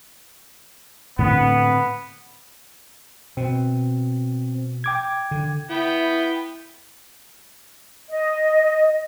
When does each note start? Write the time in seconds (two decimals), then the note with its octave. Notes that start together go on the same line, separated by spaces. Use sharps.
1.19 A2 D3 B3 C4
3.37 B2 C4
4.84 G5 D6 G#6
5.31 D3
5.70 B3 E4 G5
8.10 D#5